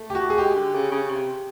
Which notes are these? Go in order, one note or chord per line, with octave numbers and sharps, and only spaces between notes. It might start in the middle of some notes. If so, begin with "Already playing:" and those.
Already playing: A3
G4
F#4
G#4
G#3 G4
D3
C#3
C#3
C3